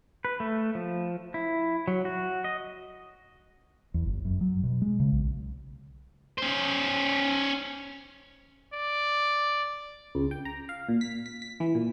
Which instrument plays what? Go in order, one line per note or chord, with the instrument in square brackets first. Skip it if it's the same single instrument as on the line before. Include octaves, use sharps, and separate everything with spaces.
[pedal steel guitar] B4
A3
F3
E4
F#3
F#4
D#5
[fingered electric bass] E2
G1
F#2
F#3
B2
G#3
C#3
B1
[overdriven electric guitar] C#4 C5
[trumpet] D5
[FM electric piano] C#2
G5
A#5
F5
A#2
B6
B6
B6
E3
A#2